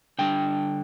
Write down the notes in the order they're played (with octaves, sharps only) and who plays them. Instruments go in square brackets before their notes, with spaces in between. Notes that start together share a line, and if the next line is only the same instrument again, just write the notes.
[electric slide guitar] D3 G3 D4 G5